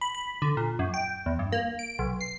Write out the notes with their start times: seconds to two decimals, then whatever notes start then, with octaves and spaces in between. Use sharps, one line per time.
0.01 B5
0.15 B5
0.42 D3
0.57 A#2
0.79 F#2
0.94 G5
1.26 E2
1.39 G2
1.52 A#3
1.79 D7
1.99 B1
2.21 C7